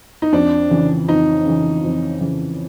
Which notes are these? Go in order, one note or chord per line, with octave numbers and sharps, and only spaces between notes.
D#4
F2 D4
C#3 E3
F2 D#4
C#3 E3
F2
C#3 E3